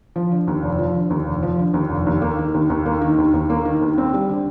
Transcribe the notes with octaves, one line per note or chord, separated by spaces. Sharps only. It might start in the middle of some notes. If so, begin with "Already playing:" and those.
F3
D3
D#2
F1
F3
D3
D#2
F1
F3
D3
D#2
F1
D#2
A#3
D#3
D#2
D#2
A#3
D#3
D#2
D#2
A#3
D#3
D#2
C4
G3
D3